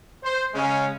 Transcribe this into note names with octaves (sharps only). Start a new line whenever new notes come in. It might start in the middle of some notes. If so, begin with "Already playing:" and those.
C5
C#3 G#3 C#4